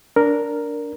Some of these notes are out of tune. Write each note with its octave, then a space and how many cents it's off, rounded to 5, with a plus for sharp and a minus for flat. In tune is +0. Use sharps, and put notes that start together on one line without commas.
D4 -15 A#4 +0